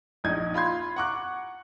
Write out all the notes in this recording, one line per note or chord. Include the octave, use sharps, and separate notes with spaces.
A#1 D#4 G#6
F4 B5 C6 G#6
F#5 A#5 C#6 D6 F#6